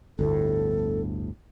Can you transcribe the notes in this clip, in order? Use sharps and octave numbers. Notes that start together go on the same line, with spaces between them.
G1 D2 A2 A4